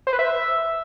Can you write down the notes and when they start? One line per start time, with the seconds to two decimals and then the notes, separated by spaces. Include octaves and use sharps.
0.07 C5
0.13 B4
0.19 E5